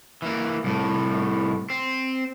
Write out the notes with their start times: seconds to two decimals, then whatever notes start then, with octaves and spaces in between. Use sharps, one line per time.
0.22 E3 A#3
0.64 C2 A2
1.70 C4